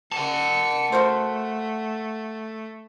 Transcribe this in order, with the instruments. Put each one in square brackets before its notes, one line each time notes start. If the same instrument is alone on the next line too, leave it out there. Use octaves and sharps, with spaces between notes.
[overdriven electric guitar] F#5 A5 [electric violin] C#7
[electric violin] A3 [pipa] F#4 A#4 C5